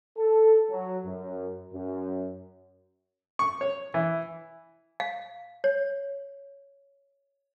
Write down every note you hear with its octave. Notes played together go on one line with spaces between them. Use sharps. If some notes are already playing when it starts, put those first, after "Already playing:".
A4
F#3
F#2
F#2
C#6
C#5
E3
F5
C#5